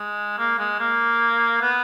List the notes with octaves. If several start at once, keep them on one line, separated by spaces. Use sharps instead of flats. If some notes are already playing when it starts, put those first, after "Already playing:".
Already playing: G#3
A#3
G#3
A#3
B3